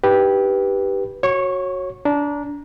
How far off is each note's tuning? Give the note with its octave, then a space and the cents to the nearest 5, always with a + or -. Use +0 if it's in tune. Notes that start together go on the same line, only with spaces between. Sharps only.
D#4 +0 G4 +0 B4 -10
F#4 +0 C#5 -20 C#6 +25
D4 -20 A#5 +0